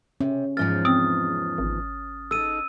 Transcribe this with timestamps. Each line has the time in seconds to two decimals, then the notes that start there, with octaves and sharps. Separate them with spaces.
0.21 C3 C#4
0.57 E2 G#2 F3 F6 A6
0.85 C4 D#6
1.58 G#1
2.31 D#4 A4 E6 D#7